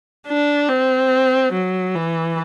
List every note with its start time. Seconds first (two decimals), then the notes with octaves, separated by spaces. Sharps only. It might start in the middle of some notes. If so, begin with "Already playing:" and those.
0.27 D4
0.69 C4
1.53 F#3
1.95 E3